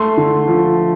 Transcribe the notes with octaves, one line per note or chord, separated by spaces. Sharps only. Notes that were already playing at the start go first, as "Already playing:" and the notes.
Already playing: A3 C6
D3
F3